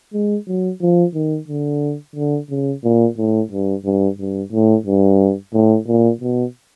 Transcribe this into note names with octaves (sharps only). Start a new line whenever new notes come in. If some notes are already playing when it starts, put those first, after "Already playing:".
G#3
F#3
F3
D#3
D3
D3
C#3
A#2
A2
G2
G2
G2
A2
G2
A2
A#2
B2